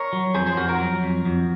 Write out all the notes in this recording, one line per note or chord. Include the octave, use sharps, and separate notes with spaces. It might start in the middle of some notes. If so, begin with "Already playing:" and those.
Already playing: A#4 C#5
F#3
F2 G#4 C5
G#4 C5
F2 F#4 A#4
F#4 A#4
F#3
F2
F2